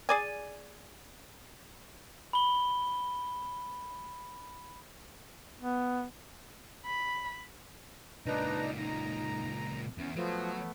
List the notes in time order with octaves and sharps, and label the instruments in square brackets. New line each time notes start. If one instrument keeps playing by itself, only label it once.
[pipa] G#4 D5 G#5
[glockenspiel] B5 G7
[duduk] B3
[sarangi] B5
[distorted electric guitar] C#2 A#2 [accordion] D4 D#4 A#5 [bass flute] B4
[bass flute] D#4 [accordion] A#5
[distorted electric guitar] E2 [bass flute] C#4
[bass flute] F3 [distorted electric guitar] F#3 [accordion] A3 B3